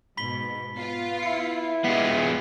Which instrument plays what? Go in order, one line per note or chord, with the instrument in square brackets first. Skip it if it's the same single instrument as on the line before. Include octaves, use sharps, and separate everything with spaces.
[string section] G#2 B2 [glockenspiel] B5 B6 G7
[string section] B3 F4 F5
[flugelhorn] E4 [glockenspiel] C#7
[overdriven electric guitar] G#3 B3 [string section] F4 G4 G#4 [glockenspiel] B6 C7